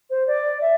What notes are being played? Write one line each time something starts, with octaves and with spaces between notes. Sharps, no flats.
C5
D5
E5